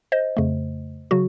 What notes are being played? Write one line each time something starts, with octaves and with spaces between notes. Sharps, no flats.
C5 D#5
F2 C#3 A3
C#3 F#3 F#4